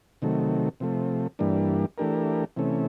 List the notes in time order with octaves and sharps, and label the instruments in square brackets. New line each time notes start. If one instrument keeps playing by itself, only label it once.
[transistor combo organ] C3 D#3 F#3 A3
C3 F3 A3
G2 E3 G3 A#3 D4
E3 A3 D4 G4 A#4
C3 E3 A3 C#4